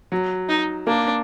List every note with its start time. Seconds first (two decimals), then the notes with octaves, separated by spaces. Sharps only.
0.12 F#3
0.49 D#4
0.87 A#3 D4